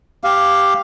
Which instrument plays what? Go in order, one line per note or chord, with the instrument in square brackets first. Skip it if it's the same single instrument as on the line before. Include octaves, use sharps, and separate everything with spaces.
[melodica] G4 F5